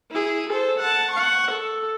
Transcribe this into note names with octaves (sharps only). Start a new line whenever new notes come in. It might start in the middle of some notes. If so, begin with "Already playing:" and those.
E4 G#4
A4 C5
F#5 A5
F#5 C#6
A4